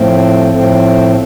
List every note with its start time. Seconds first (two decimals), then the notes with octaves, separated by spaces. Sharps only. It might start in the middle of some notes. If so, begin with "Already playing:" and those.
Already playing: A2 F3 A3 C4
0.53 A2 F3 A3 C4